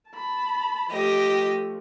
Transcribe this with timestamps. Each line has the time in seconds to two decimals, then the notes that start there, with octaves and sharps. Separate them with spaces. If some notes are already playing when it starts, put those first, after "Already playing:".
0.10 A5 B5
0.91 F3 A3 G4 D#5